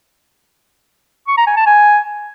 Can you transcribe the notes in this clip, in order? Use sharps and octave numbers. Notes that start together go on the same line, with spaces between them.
C#6
A#5
G#5
A5
G#5